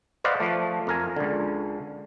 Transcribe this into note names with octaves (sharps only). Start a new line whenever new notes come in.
B4 C5 D5 D#5 F5 F#5
F3 A3
F2 A#4 G#5
C#2 D3